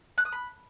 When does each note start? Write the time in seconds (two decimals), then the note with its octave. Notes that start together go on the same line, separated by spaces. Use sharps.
0.18 F#6
0.25 D#6
0.33 B5